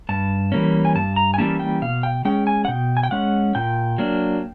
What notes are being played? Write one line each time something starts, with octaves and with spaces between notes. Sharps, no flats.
G2 A5
E3 G3 A#3 C#4
G#5
G2 A5
A#5
G#5
E3 G3 A#3 C#4 A5
G5
B2 F5
G5
G#3 C#4 G5
G#5
F#5
B2 G5
G#5
G5
G#3 C#4 F#5
A#2 G5
F#3 A#3 D4